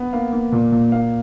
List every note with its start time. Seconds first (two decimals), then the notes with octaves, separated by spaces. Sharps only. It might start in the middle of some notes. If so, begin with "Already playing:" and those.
Already playing: B3
0.13 A#3 F5
0.32 A#3
0.52 A#2
0.72 A#2
0.92 A#3 F5